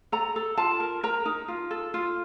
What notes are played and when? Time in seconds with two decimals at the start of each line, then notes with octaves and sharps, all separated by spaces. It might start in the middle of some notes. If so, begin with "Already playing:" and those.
0.12 A4 A#5
0.36 A4
0.57 F4 A5
0.80 A#4
1.03 A#4 A#5
1.25 D#4
1.48 F4
1.71 A4
1.94 F4